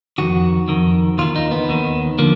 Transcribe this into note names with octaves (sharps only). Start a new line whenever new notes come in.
F2 D#3 F#4
F2 D#3
D#2 D#3 F4
D#4
B3
D#2 D#3
D3 F3 A#3